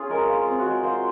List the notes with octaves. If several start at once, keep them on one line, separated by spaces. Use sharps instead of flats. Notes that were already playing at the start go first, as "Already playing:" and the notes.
Already playing: C#4 F4 G#4
G#3 A#4
F4
C4
F#4
G#3
F4 C5